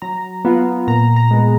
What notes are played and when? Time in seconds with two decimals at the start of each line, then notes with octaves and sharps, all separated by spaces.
0.02 F#3 A#5
0.45 B3 F4
0.87 A#2 A#5
1.16 A#5
1.31 G#3 B3